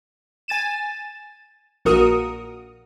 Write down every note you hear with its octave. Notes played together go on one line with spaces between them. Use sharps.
G#5 A6 D#7 E7
A#1 A#2 F#4 A#4 D#6